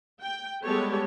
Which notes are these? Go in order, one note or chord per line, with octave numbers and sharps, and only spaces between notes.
G5
G3 G#3 B3 G4 A4 C#5